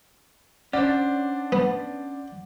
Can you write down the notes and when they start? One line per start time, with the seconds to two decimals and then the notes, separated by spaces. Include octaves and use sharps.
0.73 C#4 D4 C5 D5 F#5
1.52 B3